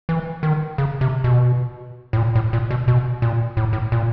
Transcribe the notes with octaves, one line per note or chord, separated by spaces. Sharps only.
E3
D#3
C#3
C3
B2
A2
A#2
A2
A#2
B2
B2
A#2
A2
A2
A#2